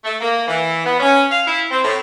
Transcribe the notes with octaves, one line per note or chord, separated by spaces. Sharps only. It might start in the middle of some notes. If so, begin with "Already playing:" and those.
A3
A#3
E3
B3
C#4
F5
E4
C4
A2